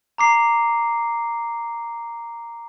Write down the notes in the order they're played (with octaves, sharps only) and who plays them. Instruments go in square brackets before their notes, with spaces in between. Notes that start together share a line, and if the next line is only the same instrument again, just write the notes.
[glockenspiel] A#5 D6 C7